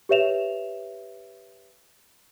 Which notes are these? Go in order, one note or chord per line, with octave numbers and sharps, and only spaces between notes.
G4 B4 C#5 E5 E7 F7